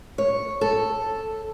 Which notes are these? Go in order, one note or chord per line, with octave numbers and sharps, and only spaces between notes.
C#5
A4